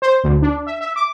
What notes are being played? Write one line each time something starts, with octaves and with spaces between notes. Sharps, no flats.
C5
D2
D4
E5
E5
D6